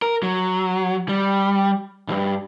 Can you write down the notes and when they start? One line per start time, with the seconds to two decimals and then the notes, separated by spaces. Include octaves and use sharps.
0.02 A#4
0.23 F#3
1.09 G3
2.08 C2 G2